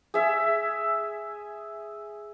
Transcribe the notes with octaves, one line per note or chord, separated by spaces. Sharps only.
G#4 E5